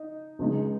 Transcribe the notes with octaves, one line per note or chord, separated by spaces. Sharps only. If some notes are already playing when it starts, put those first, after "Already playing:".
Already playing: D#4
C#2 C#3 G#3 D#4